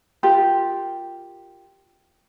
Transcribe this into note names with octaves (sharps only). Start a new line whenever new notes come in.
F4 G4 A#4